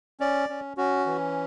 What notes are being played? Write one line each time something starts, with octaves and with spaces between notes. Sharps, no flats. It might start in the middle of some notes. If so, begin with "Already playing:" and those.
C#4 D5
C#4
C#4 F#4
E3